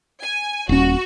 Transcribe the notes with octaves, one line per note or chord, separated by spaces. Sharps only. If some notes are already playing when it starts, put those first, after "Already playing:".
G#5
D#1 C#4 F#4